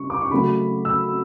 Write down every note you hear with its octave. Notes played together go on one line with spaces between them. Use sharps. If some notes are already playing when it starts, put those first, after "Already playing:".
Already playing: C#3 G3 C#6
D6
C#6
C#3 F#3 A3 B5
E6